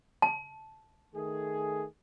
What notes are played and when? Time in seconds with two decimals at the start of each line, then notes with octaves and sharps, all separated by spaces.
0.22 A5
1.15 D#3 A3 G#4